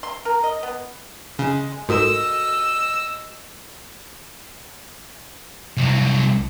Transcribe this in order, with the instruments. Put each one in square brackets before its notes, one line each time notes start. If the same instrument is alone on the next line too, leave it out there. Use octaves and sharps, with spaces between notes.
[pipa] C6
A#4
D#5
B3
[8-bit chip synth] C#3 [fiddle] G#3
[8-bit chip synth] G#2 [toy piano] F#4 A4 A#4 [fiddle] D#5 E6
[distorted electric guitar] C2 F#3